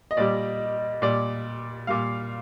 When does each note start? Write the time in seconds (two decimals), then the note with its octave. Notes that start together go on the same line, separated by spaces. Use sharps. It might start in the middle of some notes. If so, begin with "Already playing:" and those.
0.11 D#5
0.17 A#2 G3 D5
1.02 A#2 G3 D5
1.87 A#2 G3 F5